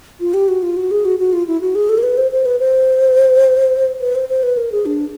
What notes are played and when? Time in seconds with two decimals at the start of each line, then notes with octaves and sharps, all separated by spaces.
0.20 F4
0.34 G4
0.48 F#4
0.62 F4
0.77 F#4
0.91 G#4
1.05 F#4
1.19 F#4
1.33 F4
1.47 E4
1.61 F#4
1.75 G#4
1.89 A4
1.98 A#4
2.03 B4
2.18 C5
2.32 C5
2.45 B4
2.60 C5
4.01 B4
4.15 C5
4.29 C5
4.43 B4
4.57 A#4
4.72 G#4
4.86 D4